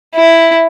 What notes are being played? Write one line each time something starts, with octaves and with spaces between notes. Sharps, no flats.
E4